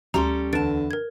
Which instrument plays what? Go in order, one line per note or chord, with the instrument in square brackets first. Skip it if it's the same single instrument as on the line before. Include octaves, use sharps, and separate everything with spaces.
[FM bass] D2 [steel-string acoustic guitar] G3 C#4 A4 [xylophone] A#5 C6
[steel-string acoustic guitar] E2 A5 [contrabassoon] D3 [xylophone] B4 A6 D7
[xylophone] A#4 G#6